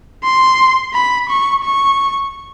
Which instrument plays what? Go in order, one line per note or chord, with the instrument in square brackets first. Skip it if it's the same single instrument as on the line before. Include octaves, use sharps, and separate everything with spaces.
[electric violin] C6
B5
C#6
C#6